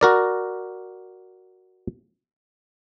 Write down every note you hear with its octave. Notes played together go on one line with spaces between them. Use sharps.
F#4 A#4 D5